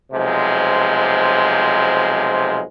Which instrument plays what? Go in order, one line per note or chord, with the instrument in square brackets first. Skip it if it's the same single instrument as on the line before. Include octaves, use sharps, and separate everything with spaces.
[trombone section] B1 C3 F3 G#3